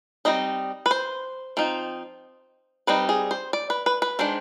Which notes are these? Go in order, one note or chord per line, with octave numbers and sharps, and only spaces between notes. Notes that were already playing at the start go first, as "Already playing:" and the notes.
G3 C4 D#4 D#5
B4
C5
F3 C4 D#4
G3 C4 D#4 B4
G#4
C5
D5
B4
B4
B4
D#3 G#3 D4 C5